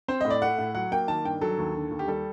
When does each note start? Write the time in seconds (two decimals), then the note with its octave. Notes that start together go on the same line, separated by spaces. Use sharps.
0.08 C4 C5
0.21 A2 D#5
0.30 D5
0.42 A3 F#5
0.58 A2
0.75 F#3 F#5
0.91 A#3 G5
1.08 D#3 A5
1.25 G2 G5
1.41 F#3 A4
1.58 D#2
1.75 D3
1.91 D#2
1.99 G4
2.08 G3 A4